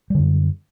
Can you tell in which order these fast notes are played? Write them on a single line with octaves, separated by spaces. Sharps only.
G3 D3 F#2